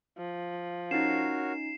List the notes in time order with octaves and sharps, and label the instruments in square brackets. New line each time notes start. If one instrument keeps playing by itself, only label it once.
[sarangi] F3
[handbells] C#4 D#4 [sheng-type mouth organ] F#4 A#4 C#5 [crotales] C7 E7